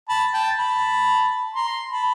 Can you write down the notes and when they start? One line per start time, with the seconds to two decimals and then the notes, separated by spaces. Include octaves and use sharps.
0.09 A5 B5
0.34 G5 A5
0.58 A5 B5
1.54 A#5 C6
1.90 A5 B5